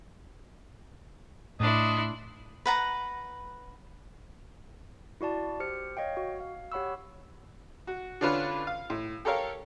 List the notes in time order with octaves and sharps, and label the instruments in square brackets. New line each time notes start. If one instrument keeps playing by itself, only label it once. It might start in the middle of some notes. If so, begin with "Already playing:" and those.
[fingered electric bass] A2 [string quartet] D4 E4 C6 [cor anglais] D#5
[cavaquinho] B4 F#5 A#5
[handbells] E4 F#4 D5 A5
G4 C5 F6 C#7
C#5 D#5 F5 G5
F#4
F5
G4 C#5 F#5 B5 C#6 E6
[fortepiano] F#4
D3 C#4 D4 F4 B4
F5
A2
G4 A4 A#4 C#5 F5